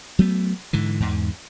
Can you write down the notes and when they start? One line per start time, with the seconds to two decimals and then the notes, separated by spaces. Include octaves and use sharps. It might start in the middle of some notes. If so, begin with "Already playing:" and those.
0.19 F#3 A3 B3
0.73 G#2 D3 E3
1.00 E2 G#2